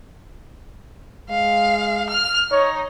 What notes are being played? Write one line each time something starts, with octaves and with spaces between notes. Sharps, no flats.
G#3 F5
F6
D#4 C#5